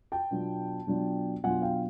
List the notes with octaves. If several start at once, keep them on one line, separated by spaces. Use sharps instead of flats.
G5 A5
B2 F#3 B3 D4 F4
B2 F#3 B3 D4 F4
B2 F#3 B3 D4 F4 F#5 G#5
F5 G5